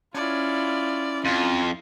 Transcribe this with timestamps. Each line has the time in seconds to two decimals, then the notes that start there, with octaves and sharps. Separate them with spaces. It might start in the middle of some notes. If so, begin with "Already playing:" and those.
0.14 C#4 E4 F4 D5
1.25 F2 F4